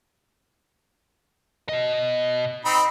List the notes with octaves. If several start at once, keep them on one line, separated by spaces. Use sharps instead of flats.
B2 D#5
C4 D#4 B5